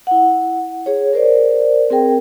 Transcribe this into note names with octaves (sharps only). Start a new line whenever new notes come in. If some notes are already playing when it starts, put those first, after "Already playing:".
E4 F#5
G#4 C#5
A#4 C5 D5
C4 G#4 A#4 G5